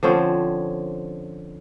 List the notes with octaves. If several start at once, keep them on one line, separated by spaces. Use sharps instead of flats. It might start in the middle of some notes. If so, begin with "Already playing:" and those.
D3 F3 C4 C#4